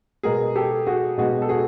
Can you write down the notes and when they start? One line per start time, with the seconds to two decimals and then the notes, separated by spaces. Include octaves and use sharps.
0.23 B2 G#3 B3 G#4 A#4
0.55 G4 A4
0.86 F#4 G#4
1.17 B2 G#3 B3 F#4 G#4
1.42 A4
1.49 F#4 G#4